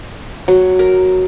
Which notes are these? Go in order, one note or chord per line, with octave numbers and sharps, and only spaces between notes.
F#3
A#4